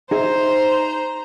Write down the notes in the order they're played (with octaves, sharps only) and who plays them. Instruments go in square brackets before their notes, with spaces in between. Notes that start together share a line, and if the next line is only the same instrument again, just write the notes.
[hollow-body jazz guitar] D#4 G#4 E5 [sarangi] C5 [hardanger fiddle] A#5